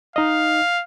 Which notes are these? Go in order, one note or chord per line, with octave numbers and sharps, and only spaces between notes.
D#4 D#5 F5